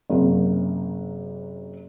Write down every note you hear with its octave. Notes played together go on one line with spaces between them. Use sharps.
F#1 C3 F#3